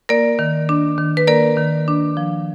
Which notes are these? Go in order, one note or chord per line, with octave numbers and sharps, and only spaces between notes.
A#3 A#4 D5
D#3
D4
D#3
B4
A#3 A#4 D5
D#3
D4
F3